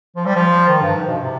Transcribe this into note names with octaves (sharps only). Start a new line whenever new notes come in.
F3
G3
F3
D#3
G2
G#2
B2
C3